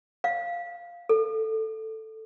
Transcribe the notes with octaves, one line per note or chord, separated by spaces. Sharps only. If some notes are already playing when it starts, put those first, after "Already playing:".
F5
A4